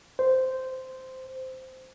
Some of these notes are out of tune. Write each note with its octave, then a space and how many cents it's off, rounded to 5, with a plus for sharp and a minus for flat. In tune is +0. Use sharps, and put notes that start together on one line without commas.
C5 -10